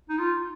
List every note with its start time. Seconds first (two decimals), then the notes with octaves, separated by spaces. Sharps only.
0.10 D#4
0.19 F4